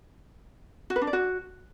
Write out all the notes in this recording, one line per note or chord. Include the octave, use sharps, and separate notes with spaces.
F#4
B4
D4
D5
F#4